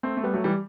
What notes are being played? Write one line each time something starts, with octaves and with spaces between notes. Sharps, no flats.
A3 C4
A3
G3 B3
F#3 A3
E3 G3